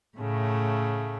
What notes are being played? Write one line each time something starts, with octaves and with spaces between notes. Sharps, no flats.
A2 C#3 A3